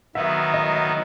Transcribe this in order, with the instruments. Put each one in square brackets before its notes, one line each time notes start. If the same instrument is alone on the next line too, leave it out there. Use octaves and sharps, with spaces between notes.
[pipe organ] D#3 F#3 B3 [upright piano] E5
[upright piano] D#5